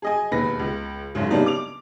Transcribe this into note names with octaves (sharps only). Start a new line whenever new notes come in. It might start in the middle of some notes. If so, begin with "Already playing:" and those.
G#4 D#5 G#5
E1 D#2 B4 A#6
C#2
F#1 G#2 C#3
C#3 G3 A#3 B3 D4 D#4
D6 F7